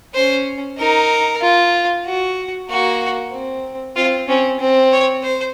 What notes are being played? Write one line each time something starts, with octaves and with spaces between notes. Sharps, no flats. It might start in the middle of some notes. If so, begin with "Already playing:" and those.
C#4 C5
D#4 A#4
F4
F#4
A#3 F#4
C4
C4 F4
C4 C#4
C4
C#5
C5